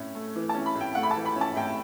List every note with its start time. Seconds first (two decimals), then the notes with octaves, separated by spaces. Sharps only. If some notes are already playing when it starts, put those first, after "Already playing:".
Already playing: A2 C#4
0.15 A3
0.35 E3
0.49 A5
0.54 C#4
0.66 B5
0.75 A2
0.81 G5
0.95 A3 F#5
1.03 B5
1.11 A5
1.16 E3
1.26 B5
1.36 C#4
1.41 A5
1.56 A2 G5